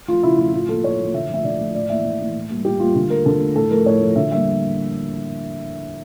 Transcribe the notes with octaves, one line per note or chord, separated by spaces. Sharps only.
F3 A3 F4
C#3 E4
F3 A3 F4
A2 F4
F3 A#3 A4
A2 C#5
F3 A#3
D3 E5
F3 A3 E5
D3 D5
F3 A3
A2 D5
E3 A#3 E5
A2
E3 A#3
A2
G3 A#3
A2 G4
G3 A#3 F4
D3 F4
A3 A#4
D3 A4
A3
A2 A4
F3 A3 A#4
A2 C#5
F3 A3
D3 E5
G3 A#3 E5